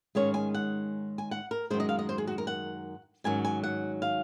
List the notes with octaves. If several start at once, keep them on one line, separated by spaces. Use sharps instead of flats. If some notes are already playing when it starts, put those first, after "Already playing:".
G#2 D#3 G#3 C#4 C#5
G#5
F#5
G#5
F#5
A#4
F#2 D#3 G#3 C5
D#5
F5
D#5
C5
G#4
F#4
A#4
F#5
G#2 D#3 F#3 C#4 G#5
G#5
F#5
F5